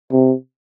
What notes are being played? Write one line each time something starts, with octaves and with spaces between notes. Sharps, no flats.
C3